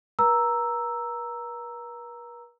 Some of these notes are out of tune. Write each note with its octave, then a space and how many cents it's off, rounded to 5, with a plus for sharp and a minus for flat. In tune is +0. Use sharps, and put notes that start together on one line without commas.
B4 -45 A#5 +0 E6 +0